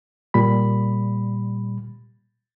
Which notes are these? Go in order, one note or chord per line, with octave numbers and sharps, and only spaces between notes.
A#2 G3 B5